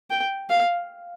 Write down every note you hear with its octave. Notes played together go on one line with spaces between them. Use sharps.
G5
F5